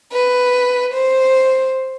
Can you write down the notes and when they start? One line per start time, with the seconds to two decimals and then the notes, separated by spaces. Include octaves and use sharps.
0.12 B4
0.93 C5